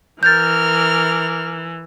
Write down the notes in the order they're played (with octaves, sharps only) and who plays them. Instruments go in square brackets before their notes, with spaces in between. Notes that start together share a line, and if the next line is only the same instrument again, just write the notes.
[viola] E3 [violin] A#4 F6 [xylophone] G6 A6